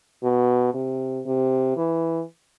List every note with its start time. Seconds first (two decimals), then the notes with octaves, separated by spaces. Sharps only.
0.23 B2
0.74 C3
1.26 C3
1.76 E3